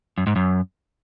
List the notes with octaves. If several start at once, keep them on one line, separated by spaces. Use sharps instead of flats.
F#2
G#2
F#2